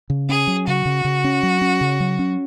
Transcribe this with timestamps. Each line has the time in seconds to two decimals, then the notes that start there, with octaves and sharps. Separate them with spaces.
0.10 C#3
0.29 C#4 G#4
0.47 F#3
0.67 C#3 F#4
0.86 C#3
1.05 C#3
1.24 C#4
1.43 F#3
1.62 C#4
1.81 C#3
2.00 F#3
2.19 C#4